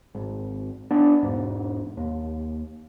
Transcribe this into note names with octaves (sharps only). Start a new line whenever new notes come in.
G#1
B3 D4
E1 G#2
D#2